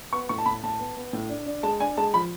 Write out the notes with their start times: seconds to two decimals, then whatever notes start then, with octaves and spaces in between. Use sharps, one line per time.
0.13 B3 C#6
0.29 A2 C#6
0.38 A5
0.46 A2 B5
0.63 A2 A5
0.80 B3
0.97 B3
1.13 A2
1.30 D4
1.46 D4
1.63 G#3 A5
1.80 D4 G#5
1.97 G#3 A5
2.14 F3 B5